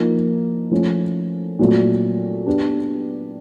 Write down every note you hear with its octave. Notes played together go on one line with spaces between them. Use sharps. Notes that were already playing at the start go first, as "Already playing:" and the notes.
Already playing: F3 A#3 D#4
F3 A3 C#4
A#2 F#3 A3 C4
B3 D4 G4